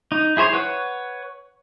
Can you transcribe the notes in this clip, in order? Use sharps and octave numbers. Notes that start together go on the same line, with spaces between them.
D#4
E4 G#4 C5 C#5
B4 C#5 F#5 F#6